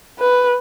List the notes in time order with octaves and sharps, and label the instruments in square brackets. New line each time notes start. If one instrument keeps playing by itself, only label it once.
[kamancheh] B4